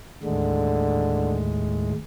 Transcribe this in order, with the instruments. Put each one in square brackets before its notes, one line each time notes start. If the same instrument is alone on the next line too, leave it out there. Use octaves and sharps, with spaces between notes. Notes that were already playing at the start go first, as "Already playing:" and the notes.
[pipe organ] D#2 A2 G#3 [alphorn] D3